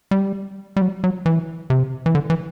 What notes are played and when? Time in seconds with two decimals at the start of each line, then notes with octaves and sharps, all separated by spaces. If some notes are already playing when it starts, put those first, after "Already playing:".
0.11 G3
0.76 G3
0.82 F#3
1.04 F#3
1.26 E3
1.70 C3
2.06 E3
2.15 D3
2.30 E3